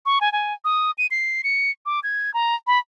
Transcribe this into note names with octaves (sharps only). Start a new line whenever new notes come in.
C#6
G#5
G#5
D#6
D#7
C7
C#7
D6
G#6
A#5
B5